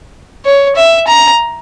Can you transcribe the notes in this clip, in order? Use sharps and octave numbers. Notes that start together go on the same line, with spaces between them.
C#5
E5
A#5